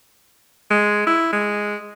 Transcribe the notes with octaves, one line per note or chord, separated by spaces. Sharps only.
G#3
E4
G#3